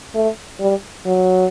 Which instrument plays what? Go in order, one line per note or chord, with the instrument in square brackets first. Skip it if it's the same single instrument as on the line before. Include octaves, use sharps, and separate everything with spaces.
[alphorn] A3
G3
F#3